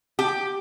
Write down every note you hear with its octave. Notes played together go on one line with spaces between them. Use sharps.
G4